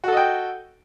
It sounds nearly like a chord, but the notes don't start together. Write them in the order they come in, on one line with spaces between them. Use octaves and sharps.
F#4 A4 D#5 G5